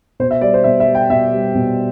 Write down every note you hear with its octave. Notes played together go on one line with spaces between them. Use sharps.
B2 C5
E5
G3 D5
C5
B2 E5
E5
G3
G5
B2 E5
G3
B2